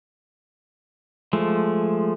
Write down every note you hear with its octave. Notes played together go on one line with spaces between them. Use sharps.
F3 G#3 A3